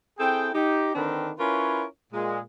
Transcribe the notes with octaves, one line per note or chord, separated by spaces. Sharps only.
C4 E4 G#4 A4 G5
D#4 G4
D3 D#3 C4 D4 A#4 B4
C#4 E4 F4 A#4 B4 C#5
A#2 G#3